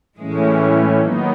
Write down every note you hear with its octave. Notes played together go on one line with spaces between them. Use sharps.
A2 E3 G#3 A3 C#4
D#3 F#3 A#3 B3 D#4